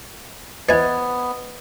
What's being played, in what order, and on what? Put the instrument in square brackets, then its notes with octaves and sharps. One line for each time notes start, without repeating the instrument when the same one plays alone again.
[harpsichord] E3 G#5 [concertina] B3 [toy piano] B4 C5 D#5